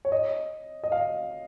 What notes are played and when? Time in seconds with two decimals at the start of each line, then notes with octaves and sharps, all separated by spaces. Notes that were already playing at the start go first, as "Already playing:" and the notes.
0.05 C#5
0.12 D#5
0.84 D#5
0.92 F5